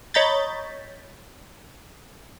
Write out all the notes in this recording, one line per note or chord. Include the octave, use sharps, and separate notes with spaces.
C#5 D#5 A#5 B5 G6 A6